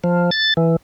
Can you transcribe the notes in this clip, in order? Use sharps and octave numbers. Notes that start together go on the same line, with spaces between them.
F3
A6
E3